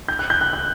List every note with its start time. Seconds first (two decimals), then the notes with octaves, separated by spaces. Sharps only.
0.08 G6
0.19 F#6
0.30 G6
0.41 F#6
0.53 F#6